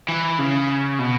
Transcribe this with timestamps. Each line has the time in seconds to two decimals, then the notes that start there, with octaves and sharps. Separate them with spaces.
0.09 E3
0.39 C#3
0.99 B2